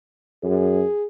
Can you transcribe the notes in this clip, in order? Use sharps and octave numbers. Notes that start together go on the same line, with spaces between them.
F#2 G#4